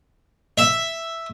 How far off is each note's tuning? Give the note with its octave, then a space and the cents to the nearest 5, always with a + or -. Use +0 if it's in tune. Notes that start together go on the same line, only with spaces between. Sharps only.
E5 +0